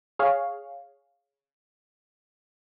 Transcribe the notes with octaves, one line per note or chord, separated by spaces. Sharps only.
G#4 C#5 F5